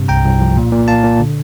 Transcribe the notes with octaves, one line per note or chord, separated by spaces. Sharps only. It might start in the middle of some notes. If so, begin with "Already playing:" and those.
Already playing: G2 C3
C2 G5 A#5
C2
F3
A#2
A#2
A#2 F5 A5
A#2
D3